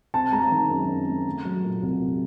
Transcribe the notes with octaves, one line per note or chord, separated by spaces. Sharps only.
C4 A5
G#3 A#5
A5
D#3
F#2
C4
G#3
A3
F#3
A#2
C2
A3